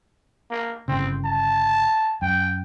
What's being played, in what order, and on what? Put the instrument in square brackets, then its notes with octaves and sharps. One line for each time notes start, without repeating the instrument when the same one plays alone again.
[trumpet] A#3
[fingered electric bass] G1 C#3 [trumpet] C4
[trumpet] A5
[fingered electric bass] F#2 [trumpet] G5